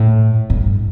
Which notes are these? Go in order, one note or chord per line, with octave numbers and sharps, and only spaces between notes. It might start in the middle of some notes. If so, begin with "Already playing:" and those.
Already playing: A2
G2